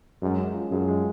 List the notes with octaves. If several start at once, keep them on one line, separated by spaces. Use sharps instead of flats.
F#2 G#3
C#4
F3
F#2 G#4
G#3